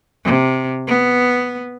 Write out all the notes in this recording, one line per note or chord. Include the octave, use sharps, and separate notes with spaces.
C3
B3